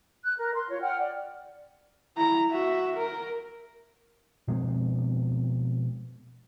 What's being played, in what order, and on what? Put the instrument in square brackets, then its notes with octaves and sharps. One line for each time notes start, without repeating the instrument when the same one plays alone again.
[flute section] F#6
A#4
C6
F4 C#5
F#5 G5 F6
D5
[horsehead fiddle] E4 A#5
F#4 E5
A#4
[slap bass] B2 F3 G#3 C4